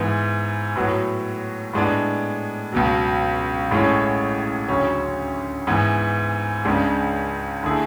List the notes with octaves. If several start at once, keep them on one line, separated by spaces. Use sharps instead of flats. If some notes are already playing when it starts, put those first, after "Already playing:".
Already playing: G#2 E3 B3
A2 F#3 B3 F#4 C#5
A2 G#3 B3 D4
C#2 B2 F#3
A1 A2 G#3 C#4
D2 C#3 F#3 C#4
G#2 E3 B3
C#2 C#3 G#3 D4
D3 A3 E4 G#4